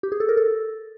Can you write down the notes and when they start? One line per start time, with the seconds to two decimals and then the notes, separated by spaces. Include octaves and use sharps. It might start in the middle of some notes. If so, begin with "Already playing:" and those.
0.03 G4
0.12 G#4
0.20 A4
0.29 A#4
0.37 A4